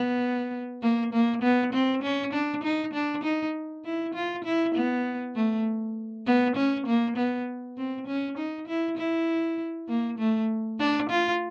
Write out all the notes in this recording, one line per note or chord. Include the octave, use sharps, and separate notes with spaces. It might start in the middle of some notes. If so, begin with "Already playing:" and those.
Already playing: B3
A#3
A#3
B3
C4
C#4
D4
D#4
D4
D#4
E4
F4
E4
B3
A3
B3
C#4
A#3
B3
C4
C#4
D#4
E4
E4
A#3
A3
D4
F4